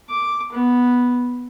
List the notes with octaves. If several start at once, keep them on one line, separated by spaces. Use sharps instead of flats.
D6
B3